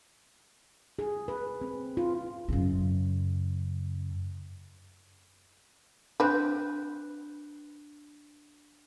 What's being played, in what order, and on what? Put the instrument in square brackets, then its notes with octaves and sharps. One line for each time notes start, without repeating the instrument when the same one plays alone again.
[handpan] G#4
B4
C4
F4
[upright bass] F#2 C#3
[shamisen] C4 B4 [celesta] D4 F#6 G6